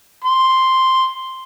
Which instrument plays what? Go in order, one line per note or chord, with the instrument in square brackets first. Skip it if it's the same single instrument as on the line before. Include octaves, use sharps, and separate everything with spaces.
[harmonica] C6